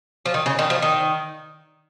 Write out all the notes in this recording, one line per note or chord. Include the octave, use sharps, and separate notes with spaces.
F3
D#3
C#3
D#3
F3
D#3